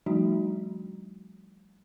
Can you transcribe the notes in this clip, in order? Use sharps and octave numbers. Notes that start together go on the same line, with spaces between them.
F3 G3 A3 D4 D#4 F#4